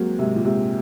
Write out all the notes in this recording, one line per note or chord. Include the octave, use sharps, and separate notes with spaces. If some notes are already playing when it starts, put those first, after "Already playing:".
Already playing: F#3 G#3 A#3 C4
G#2 C3
A#2
G#2 C3